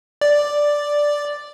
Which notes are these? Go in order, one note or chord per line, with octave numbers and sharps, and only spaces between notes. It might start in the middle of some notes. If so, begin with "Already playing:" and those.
D5